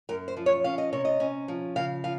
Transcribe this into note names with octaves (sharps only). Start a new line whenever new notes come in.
F#2 A#4
C5
F3
C#5
C#4 F5
D#5
C3 C#5
D#5
C#4
F3
C#3 F5
F3 F5